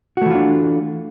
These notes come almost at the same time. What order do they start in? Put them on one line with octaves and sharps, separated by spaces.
F#4 A3 E3 F4 D4